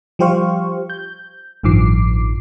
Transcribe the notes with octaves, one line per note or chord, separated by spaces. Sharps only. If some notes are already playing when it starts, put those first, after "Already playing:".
F3 G3 G4 C5 F5 C#6
G6
A1 G2 D#3 F3 D6 C7